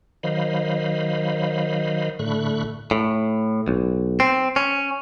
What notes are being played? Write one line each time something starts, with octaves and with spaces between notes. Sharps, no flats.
D#3 F#3 C5 D#5 F5 B5
A2 D3 A3 B5 C#6 F#6
A2
B1
C4
C#4